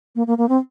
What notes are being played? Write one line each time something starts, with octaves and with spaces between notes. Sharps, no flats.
A#3
A#3
A#3
C4